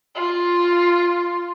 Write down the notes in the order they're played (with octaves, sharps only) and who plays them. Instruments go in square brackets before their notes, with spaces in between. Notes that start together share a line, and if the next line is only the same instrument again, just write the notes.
[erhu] F4